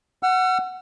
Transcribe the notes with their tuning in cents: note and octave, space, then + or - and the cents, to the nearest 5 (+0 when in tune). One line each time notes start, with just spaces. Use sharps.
F#5 +0 E6 +45